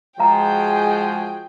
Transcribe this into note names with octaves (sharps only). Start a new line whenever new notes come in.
F3 G#3 F#4 G#4 F5 G5 A#5